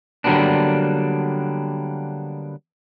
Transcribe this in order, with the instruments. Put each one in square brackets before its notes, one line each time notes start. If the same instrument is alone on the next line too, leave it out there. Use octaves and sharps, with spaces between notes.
[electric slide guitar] D3 F#3 G3 A#3 B3 D4